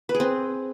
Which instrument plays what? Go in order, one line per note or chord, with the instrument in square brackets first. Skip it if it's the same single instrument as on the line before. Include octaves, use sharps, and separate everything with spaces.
[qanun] B4
G#4
C4